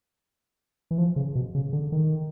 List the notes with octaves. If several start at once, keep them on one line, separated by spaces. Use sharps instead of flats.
E3
F3
C#3
B2
C#3
D3
D#3